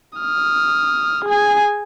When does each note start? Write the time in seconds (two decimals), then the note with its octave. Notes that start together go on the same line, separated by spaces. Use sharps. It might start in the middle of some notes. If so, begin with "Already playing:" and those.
0.19 D#6 F6
1.25 G#4 G#5